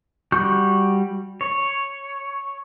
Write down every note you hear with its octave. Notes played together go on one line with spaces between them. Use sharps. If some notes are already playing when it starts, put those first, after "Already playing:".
G3 F#4 C#6 F#6 G6
C#5